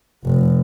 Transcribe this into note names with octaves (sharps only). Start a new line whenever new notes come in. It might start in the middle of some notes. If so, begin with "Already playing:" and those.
F1